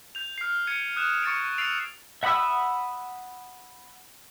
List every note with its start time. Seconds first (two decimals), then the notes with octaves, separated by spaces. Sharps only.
0.15 G6 F7
0.38 F6 C7
0.67 G#6 C#7 D#7
0.96 D#6 F#6 E7
1.23 C#6 A6 C#7 D7
1.58 E6 A6 C7 D7 F7
2.23 E5 F#5 B5 D#6 E6